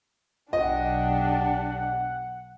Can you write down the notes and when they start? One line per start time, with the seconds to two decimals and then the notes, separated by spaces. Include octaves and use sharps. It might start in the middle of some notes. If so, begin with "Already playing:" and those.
0.53 B1 D4 G4 D#5 F#5